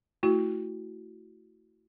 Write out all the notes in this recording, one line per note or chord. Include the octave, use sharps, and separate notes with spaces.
A3 E4 F#4